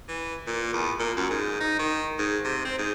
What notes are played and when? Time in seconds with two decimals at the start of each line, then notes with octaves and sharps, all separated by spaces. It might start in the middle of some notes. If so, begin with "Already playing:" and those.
0.09 E3
0.47 A#2
0.73 E2
0.99 A#2
1.17 F#2
1.30 G#2
1.60 D#4
1.79 D#3
2.19 G#2
2.45 C3
2.65 C4
2.78 G#2